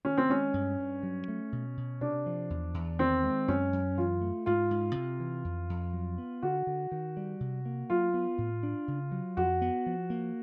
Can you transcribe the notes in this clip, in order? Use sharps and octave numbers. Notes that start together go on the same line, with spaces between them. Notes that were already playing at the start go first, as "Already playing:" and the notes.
D#3 C#4
C4
G#3 C#4
G2
G2
F#3
A3
B2
B2
C3 D4
F3
E2
E2
D#3 C4
G#3
F#2 C#4
F#2
E3 F4
A3
G#2 F4
G#2
C3
E3
F2
F2
F#3
B3
D3 F#4
D3
D#3
G3
C3
A#3
F#3 F4
B3
A2
D4
C#3
F#3
F2 F#4
B3
F3
A#3